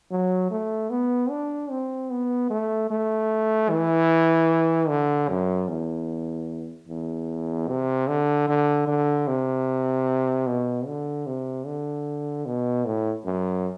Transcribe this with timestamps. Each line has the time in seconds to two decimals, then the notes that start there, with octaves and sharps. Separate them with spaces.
0.11 F#3
0.51 A3
0.90 B3
1.30 D4
1.70 C4
2.10 B3
2.50 A3
2.90 A3
3.70 E3
4.89 D3
5.29 F#2
5.68 E2
6.88 E2
7.68 C3
8.08 D3
8.48 D3
8.87 D3
9.27 C3
10.47 B2
10.87 D3
11.26 C3
11.66 D3
12.46 B2
12.86 A2
13.25 F#2